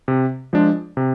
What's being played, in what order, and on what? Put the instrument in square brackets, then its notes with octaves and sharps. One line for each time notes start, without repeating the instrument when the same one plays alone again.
[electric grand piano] C3
F3 G#3 D4
C3